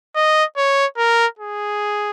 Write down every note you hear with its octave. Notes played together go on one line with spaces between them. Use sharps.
D#5
C#5
A#4
G#4